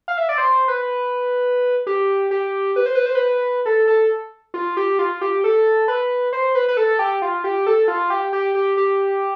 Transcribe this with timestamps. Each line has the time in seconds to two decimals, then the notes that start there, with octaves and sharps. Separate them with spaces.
0.08 F5
0.18 E5
0.29 D5
0.38 C5
0.68 B4
1.87 G4
2.31 G4
2.76 B4
2.86 C5
2.95 B4
3.06 C5
3.15 B4
3.66 A4
3.87 A4
4.54 F4
4.77 G4
4.99 F4
5.21 G4
5.44 A4
5.88 B4
6.33 C5
6.55 B4
6.68 B4
6.77 A4
6.99 G4
7.22 F4
7.44 G4
7.67 A4
7.88 F4
8.10 G4
8.33 G4
8.55 G4
8.77 G4